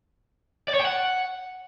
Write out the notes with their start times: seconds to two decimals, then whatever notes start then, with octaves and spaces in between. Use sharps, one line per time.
0.68 D5
0.74 C#5
0.80 G5
0.85 F#5